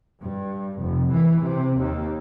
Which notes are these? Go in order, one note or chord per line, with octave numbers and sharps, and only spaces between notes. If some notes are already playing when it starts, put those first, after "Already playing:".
G2
F1
E3
C3
D#2